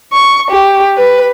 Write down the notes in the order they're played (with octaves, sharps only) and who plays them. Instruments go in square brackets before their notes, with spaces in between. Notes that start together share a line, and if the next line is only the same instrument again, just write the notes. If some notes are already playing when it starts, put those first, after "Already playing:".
[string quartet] C#6
G4
B4